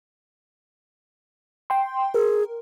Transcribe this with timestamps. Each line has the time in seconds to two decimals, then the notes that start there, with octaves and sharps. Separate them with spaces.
1.70 G5 C6
2.14 G#4 A#4